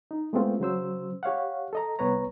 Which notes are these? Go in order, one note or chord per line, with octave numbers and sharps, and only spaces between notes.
D#4
G#3 A3 B3 C4 F4
C#3 F#3 C5 E6
G4 C#5 F5 F#5
A4 D#5 A#5
C2 B3 B4 C#5 A#5